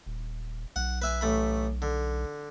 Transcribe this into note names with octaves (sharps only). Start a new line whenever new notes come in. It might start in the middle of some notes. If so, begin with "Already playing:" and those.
D#1
B1 F#5
B4 E5 G#5
A1 A3 B5
D3